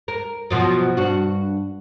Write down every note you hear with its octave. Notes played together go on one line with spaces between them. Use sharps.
A#4
B2 F3 F#3
G2 F#4